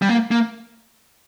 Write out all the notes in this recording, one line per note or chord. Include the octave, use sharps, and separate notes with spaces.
G3
A#3
A#3